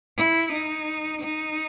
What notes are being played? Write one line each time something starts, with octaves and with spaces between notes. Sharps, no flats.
E4
D#4
D#4